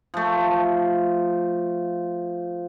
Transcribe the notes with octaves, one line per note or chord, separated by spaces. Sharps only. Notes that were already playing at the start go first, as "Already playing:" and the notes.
F3 A3